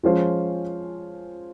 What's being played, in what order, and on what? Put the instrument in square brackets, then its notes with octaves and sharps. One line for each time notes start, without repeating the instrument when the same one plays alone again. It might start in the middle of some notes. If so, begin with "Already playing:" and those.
[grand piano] F3 G#3 C#4 F4 C5